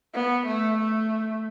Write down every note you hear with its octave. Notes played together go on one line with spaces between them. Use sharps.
B3
A3
A3